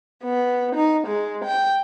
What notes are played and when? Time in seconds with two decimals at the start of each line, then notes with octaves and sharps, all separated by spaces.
0.22 B3
0.74 D#4
1.05 G#3
1.43 G5